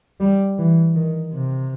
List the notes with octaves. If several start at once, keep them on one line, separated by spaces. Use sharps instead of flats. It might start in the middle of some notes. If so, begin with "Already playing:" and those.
G3
E3
D#3
C3